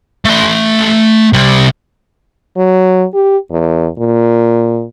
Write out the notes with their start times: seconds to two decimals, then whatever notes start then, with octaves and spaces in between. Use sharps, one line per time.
0.25 A3 C6
1.33 C3 G3
2.57 F#3
3.14 G4
3.51 E2
3.98 A#2